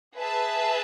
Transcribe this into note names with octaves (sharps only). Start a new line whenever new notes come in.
G#4 B4 E5 A5